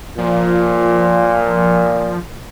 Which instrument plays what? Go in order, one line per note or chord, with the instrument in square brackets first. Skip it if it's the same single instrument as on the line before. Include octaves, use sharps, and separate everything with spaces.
[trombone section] A#2 [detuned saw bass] F3